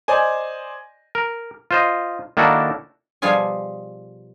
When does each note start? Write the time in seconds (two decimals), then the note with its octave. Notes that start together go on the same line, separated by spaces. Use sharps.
0.08 C5 D5 D#5 G#5
1.15 A#4
1.71 F4 C5 D#5
2.37 D#3 A#3 D4 E4 F#4 A4
3.22 B2 F3 G3 F4 G#4 G#5